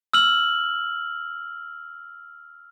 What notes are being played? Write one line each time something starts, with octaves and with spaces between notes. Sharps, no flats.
E6 F6 F#7